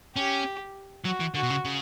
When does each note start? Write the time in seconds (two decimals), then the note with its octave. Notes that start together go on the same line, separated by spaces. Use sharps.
0.16 C#4 G4
1.05 F#3 F#4
1.20 E3
1.35 D3 F#4
1.43 B2
1.50 C#3
1.65 C#3